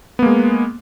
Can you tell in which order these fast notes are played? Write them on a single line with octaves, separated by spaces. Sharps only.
B3 A#3 G#3